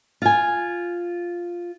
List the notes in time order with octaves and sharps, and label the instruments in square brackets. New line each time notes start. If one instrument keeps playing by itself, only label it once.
[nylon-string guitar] F4 G#5